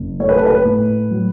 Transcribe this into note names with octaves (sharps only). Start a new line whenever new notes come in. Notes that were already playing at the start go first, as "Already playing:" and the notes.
Already playing: F#1
A3 C#5
B4
A4
B4
A2
F#3